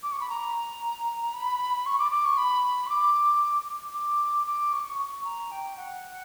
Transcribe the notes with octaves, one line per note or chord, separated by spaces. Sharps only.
D6
C#6
B5
A#5
B5
C#6
D6
D6
C#6
B5
C#6
D6
D6
D6
C#6
C#6
A#5
G5
F#5